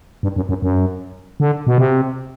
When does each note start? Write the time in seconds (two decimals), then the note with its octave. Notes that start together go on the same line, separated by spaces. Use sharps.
0.23 G2
0.36 F#2
0.49 F#2
0.62 F#2
1.40 D3
1.67 B2
1.78 C3